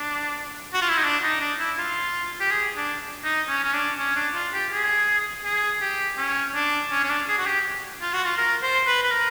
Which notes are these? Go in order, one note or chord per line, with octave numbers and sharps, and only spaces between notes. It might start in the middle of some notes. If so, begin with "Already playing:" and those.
Already playing: D4
F#4
F4
E4
D#4
D4
D#4
D4
E4
F4
G4
G#4
D4
D#4
C#4
C#4
D4
C#4
D4
F4
G4
G#4
G#4
G4
C#4
D4
C#4
C#4
D4
G#4
F#4
G4
F4
F#4
F4
A#4
C5
B4
B4
A#4